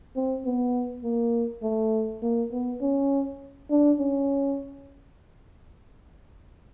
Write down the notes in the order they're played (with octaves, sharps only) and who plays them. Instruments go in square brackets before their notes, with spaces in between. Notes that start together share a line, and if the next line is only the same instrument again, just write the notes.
[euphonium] C4
B3
A#3
A3
A#3
B3
C#4
D4
C#4